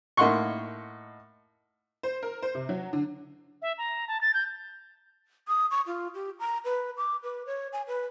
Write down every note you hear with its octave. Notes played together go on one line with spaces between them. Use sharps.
A2 A#3 D#4 F#5 C6 C#6
C5
A#4
C5
C3
F#3
D3
E5
A#5
A5
A6
G6
D#6
C#6
F4
G4
A#5
B4
D6
B4
C#5
G#5
B4